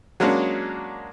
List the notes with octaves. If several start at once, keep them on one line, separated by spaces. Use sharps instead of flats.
F#3 G#3 A#3 C#4 D4